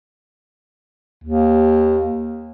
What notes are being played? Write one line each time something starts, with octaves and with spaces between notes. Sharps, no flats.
D#2